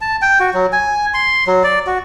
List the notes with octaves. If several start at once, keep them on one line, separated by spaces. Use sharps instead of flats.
A5
G5
F#4
F#3
G#5
C6
F#3
D5
F#4